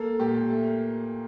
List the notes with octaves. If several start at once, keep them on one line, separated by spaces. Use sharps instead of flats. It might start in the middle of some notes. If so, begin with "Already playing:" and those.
Already playing: A#3 A4
A#2 G4
A3